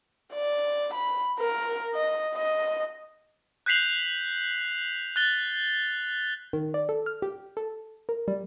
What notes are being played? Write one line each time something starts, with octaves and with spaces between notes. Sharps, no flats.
D5
B5
A#4
D#5
D#5
F#6 G6 B6 C7 F7 F#7
F#6 A6 G7
D#3
D5
A4
F6
G4
A4
A#4
G3